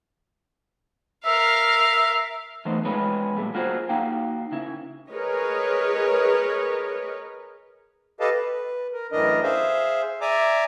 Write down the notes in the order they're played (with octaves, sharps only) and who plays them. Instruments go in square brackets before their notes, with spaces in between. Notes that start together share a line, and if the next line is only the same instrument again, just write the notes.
[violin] A#4 F5 [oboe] E5
[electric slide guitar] E3 A3 B3 D#4 C5
F3 G#3 G#4 B4 C#5
A#2 G3 A3
A#3 F4 F#4 G#4 B4 C5
A#3 D#4 F#4 F5 G5
C#3 E4
[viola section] G#4 A#4 B4 C#5 D#5
[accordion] G4 A4 B4 D#5 F5 A5
B4
A#4
F#2 A2 E3 D4 A#4 D#5
G#4 C5 E5 F5
D5 E5 G#5 A#5 D6